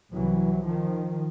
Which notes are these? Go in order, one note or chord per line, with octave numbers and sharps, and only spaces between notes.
C2 C3 E3 F#3
D#3 F3